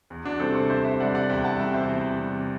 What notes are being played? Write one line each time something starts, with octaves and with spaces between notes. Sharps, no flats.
E2
D4 F#4
C3 G3 A4 C5
A4 C5
E2 C5 E5
C5 E5
C3 G3 D5 F#5
D5 F#5
E2 E5 G5
F#5 A5
C3 G3 E5 G5
C5 E5
E2
C3 G3